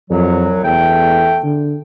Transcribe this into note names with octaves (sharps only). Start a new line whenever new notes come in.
C2 F2 F#3
E2 A3 G5
D3